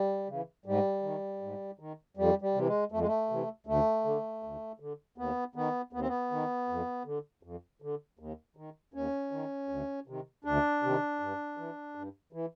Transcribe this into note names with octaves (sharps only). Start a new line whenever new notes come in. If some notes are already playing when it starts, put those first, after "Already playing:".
Already playing: G3
C#3 E3
G#2 G3
D#3
G#2
D#3
F2 G3
G3
C3 E3
G#3
F2 A3
G#3
A3
C3 E3
D2 A3
D3
D2
D3
D#2 B3
D#3 B3
D#2 B3
C4
B3
D#3
F2
D3
F2
D3
D#2
D#3
D#2 C#4
D#3
D2
C3 D#3
D2 D4
C3 D#3
G2
E3
G2
E3